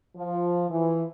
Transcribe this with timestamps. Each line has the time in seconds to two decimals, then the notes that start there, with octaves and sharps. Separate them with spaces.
0.16 F3
0.70 E3